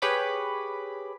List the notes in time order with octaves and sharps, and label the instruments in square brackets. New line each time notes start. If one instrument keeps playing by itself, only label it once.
[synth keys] G4 G#4 B4 C#5 B5 D6